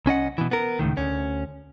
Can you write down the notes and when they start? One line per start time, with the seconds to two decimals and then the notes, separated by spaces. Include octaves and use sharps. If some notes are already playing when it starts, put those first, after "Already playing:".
0.06 C2 C#4 D#5 F#5
0.38 B2 E3
0.51 B3 A#4
0.79 C#2 F#2 A2 D#3
0.97 D2 C#4